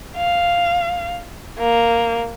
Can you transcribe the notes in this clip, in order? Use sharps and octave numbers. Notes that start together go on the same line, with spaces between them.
F5
A#3